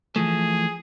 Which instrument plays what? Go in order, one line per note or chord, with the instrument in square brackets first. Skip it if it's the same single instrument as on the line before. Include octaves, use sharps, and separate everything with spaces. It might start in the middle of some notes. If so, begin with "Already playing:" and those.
[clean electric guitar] E3 F3 A3 [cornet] G#4